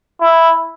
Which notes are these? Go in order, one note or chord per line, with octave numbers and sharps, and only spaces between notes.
E4